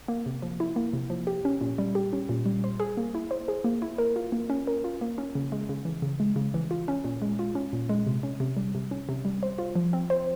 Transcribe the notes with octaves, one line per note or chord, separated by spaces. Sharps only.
A#3
C3
F3
E4
A#3
C3
F3
G4
C#4
A#2
G3
G4
C#4
A#2
G3
C5
G#4
A#3
E4
C5
G#4
A#3
E4
A#4
F4
A#3
C#4
A#4
F4
A#3
C#4
C#3
G#3
C#3
E3
C#3
G#3
C#3
E3
F4
C#4
A#2
G#3
F4
C#4
A#2
G#3
C3
C#4
C3
G3
C3
C#4
C3
G3
C5
F4
F3
C4
C5